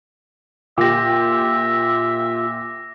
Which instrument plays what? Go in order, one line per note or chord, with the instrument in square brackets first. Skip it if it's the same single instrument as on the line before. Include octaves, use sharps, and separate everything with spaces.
[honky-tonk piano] A#2 G4 [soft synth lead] F4 [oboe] E5 [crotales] D6 A#6